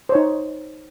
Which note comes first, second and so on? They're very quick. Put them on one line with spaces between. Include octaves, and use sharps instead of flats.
C5 C#5 D#4